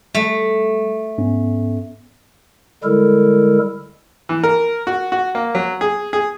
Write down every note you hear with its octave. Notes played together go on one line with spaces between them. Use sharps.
G3 A3
G#2 B3 C#4
D3 G3 G#3 E4 A4 A#4
E3
A#4
F#4
F#4
A#3
F#3
G#4
G#4